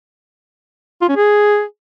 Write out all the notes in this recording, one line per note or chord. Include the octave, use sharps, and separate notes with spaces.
F4
C#4
G#4